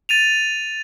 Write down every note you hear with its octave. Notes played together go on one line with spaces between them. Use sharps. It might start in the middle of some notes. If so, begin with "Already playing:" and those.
A6 D#7 F7